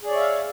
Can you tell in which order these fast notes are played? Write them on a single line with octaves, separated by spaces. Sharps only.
G#4 D5 C#5 E5 F5